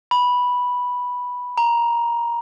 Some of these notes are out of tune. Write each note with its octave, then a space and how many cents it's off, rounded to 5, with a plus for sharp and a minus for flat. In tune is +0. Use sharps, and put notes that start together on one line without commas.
B5 -5
A#5 +10